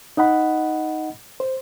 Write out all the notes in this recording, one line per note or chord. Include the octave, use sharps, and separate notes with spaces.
D#4 D#5 F#5 B5
C5